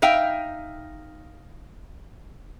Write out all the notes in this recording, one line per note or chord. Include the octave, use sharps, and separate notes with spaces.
D#4 E5 F5 G5